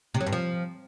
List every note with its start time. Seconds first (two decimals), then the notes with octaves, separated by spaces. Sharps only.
0.14 C3
0.20 F#3
0.26 G2
0.32 F3